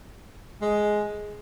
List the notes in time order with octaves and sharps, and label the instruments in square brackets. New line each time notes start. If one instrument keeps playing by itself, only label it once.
[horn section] G#3